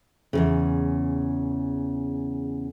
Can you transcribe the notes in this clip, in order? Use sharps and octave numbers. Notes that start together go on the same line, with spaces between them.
E2 G2 C#3